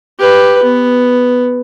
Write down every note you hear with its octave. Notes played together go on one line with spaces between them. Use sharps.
G4 B4
B3